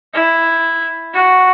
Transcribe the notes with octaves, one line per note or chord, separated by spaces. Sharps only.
E4
F#4